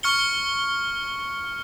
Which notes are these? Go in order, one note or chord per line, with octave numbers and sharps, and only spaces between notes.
C#6 F6 C#7 G7